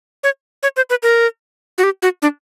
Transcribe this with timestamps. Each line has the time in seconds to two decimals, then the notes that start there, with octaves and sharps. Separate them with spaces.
0.23 C#5
0.63 C#5
0.77 C5
0.90 B4
1.03 A#4
1.78 F#4
1.83 G4
2.02 F#4
2.22 D4